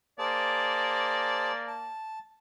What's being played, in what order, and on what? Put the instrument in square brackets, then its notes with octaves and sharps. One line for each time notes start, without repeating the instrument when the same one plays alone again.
[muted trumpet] A#3 [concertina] G#4 C5 A5 [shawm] D5
[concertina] A5